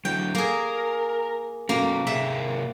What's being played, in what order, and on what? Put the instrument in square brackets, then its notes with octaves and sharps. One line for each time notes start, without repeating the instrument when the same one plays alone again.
[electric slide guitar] D3 F#3 [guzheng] G5
[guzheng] A#3 G#4 [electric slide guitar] A#4
[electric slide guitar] B2 F#3 C#4 [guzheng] A#3
[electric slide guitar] C3 A#3 G#4 [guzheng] E5